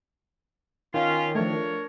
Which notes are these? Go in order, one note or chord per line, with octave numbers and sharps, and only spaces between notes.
D#3 C#4 F4 F5
F3 A3 D4 A#4 C#5